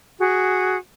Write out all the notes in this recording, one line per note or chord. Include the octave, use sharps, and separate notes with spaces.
F#4 G#4